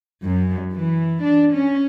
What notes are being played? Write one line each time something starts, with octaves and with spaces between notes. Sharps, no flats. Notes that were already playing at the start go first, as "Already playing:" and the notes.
F#2
E3
D4
C#4